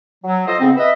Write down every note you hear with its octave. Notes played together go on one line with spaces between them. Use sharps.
F#3
F4 A4 C5 D#5
G#2 C#3 B3 C4
B4 D#5 E5